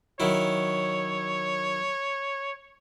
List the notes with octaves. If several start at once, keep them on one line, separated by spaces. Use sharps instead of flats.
D#3 F#3 E4 C#5